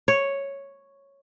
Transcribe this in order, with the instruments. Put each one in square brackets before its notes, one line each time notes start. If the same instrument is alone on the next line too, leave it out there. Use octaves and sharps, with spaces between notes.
[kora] C#5